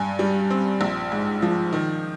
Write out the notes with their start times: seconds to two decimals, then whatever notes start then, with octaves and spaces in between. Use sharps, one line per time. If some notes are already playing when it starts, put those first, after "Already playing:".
Already playing: G2 G#5
0.19 G3
0.50 C4
0.81 A#1
1.12 G#2
1.42 F3
1.73 D#3